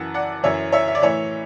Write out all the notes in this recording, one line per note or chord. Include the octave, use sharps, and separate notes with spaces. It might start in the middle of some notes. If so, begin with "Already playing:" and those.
Already playing: F#2 E3 F#5 A5
D5 F#5
F#2 E3 C#5 E5
C#5 E5
E5
D5
A2 E3 C#5 E5